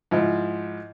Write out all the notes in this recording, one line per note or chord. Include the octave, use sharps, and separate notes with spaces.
G#2 F3 E4